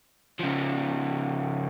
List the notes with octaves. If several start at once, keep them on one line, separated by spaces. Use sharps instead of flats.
C#3 F3